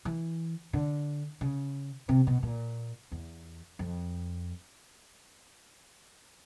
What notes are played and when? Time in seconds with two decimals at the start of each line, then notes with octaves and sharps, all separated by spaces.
0.05 E3
0.73 D3
1.41 C#3
2.09 C3
2.27 B2
2.43 A#2
3.12 E2
3.79 F2